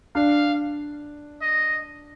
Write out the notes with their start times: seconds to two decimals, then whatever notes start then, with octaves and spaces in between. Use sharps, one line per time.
0.15 D4 F5
1.42 D#5